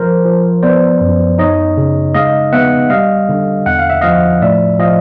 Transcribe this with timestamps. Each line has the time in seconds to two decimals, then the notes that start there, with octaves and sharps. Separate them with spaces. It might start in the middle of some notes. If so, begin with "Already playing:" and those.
Already playing: F3 A#4 C5
0.25 F3
0.63 B3 C5 D5
1.01 F#2
1.39 D#4 C#5 D#5
1.77 C#3
2.14 G#3 D#5 F5
2.53 B3 E5 F#5
2.90 G3 D#5 F5
3.29 D3
3.66 E2 F#5
3.79 F5
3.90 E5
4.01 F3 D#5 F5
4.41 A2 D5 E5
4.79 F3 D#5 F5